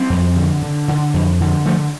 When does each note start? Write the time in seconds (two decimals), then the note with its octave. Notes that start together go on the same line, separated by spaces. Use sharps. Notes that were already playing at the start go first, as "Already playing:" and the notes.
Already playing: G3 C4
0.10 F2
0.36 D3
0.62 D3
0.88 D3
1.14 F2
1.40 D3
1.65 D3 F3 A3